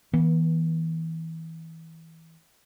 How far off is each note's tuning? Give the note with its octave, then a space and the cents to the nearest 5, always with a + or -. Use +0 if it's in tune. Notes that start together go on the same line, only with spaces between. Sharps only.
E3 -25 B3 -40